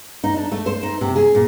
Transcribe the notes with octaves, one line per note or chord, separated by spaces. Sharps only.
D#4
D4
A3
C5
D#4
C3
G#4
A#2